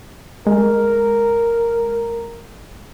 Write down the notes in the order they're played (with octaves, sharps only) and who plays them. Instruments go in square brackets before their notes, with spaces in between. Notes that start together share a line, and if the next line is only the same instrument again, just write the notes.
[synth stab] G#3 [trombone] A#4